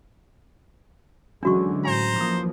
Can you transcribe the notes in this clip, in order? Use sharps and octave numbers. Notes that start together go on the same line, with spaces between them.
D3 E3 F#3 G#3 C#4 D4 F#4 C#6
A2 C5 G#5 A#5
E3 F3 A#3 D6 D#6